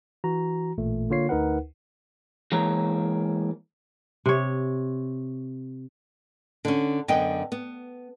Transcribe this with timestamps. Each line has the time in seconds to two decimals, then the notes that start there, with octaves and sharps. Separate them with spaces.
0.24 E3 F#4 A#5
0.78 A1 A#2 A3
1.10 D3 A#3 F4 C#5 C7
1.29 D2 D#4 A#4 B4 F#5
2.52 E3 G#3 A#3 C#5 A#5
4.26 C3 C#5
6.65 D3 C#4
7.08 F#2 D3 B3 D#5 G5
7.52 B3